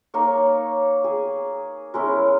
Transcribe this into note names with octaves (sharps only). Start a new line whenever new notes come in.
A#3 D#4 C#5
G#4
G#3 C#4 E4 A#4